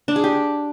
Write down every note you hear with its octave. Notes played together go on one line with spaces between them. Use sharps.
D4
G#4
G4